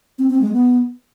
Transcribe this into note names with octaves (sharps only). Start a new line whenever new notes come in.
C4
C4
G#3
B3